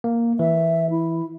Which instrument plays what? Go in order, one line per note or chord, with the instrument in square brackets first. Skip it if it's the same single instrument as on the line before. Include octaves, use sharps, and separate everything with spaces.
[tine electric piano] A#3
[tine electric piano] E3 [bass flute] E5
[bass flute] E4